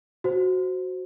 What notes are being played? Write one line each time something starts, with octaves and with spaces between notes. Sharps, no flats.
F#4 C5